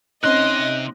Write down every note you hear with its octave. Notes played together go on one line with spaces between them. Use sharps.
C3 C4 C#4 D#4 D#5 C6 F#6